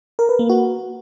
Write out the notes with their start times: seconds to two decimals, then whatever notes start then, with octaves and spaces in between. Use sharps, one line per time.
0.19 A#4
0.29 B4
0.39 A#3
0.49 F#4